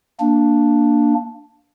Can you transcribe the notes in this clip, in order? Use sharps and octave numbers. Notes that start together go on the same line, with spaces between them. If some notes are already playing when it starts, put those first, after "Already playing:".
A#3 D4